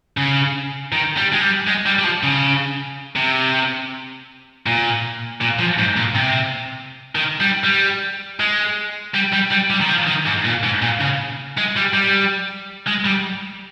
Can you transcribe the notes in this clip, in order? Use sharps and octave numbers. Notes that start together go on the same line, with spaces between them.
C#3
D#3
G3
G#3
G3
G#3
G3
G3
F3
C#3
C3
A#2
A#2
F3
G#2
A#2
C3
D#3
G3
G3
G#3
G3
G3
G3
G3
D#3
F3
D#3
G#2
A#2
G#2
A#2
C#3
G#3
G3
G3
G#3
G3